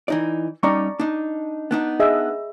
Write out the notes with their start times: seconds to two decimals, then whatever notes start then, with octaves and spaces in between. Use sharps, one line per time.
0.08 E3 D#4 D5
0.63 G3 C#4 D#4 D5 A#5 C#6
1.00 D4 D#4
1.71 B3 D4 D#4
2.00 G#4 D#5 E5